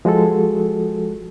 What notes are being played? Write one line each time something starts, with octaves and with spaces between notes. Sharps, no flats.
F3 G#3 F#4 G#4 A4